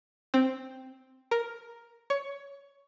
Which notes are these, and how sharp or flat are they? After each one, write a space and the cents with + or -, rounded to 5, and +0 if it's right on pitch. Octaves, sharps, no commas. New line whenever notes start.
C4 +0
A#4 +5
C#5 +15